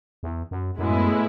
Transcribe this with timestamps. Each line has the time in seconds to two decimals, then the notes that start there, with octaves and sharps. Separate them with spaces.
0.23 E2
0.51 F#2
0.79 F#2 A2 G#3 B3 E4